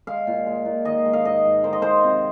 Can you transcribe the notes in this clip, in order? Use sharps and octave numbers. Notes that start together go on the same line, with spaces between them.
G#3 F5
A#2
G#3
A#2
D#3 D#5
G#3
F5
G#2 D#5
G#2
D#3 C5
D#5
G#3 C5
C3